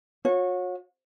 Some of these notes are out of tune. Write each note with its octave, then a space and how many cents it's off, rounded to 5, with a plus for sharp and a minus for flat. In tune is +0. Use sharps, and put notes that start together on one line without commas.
F#4 -40 C#5 -20